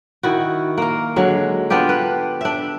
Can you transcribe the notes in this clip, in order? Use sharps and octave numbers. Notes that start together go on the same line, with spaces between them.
D#3 E4 F#4
A#3 A#4
D3 F#3 G#3
B3 D4 F4 G4
B4
D4 E5